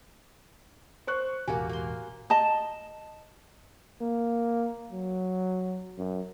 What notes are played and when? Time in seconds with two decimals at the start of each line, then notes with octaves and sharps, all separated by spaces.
1.07 C5 C#6 F#6
1.47 E1 A1 A#3 F#4 G4 G#5
1.69 A#3 C6
2.30 D#5 A5
4.01 A#3
4.91 F#3
5.98 F#2